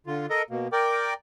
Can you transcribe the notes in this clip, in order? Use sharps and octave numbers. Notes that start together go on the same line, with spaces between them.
D3 F4
A4 A#4 D#5
B2 A#3
A#4 D5 G5 D6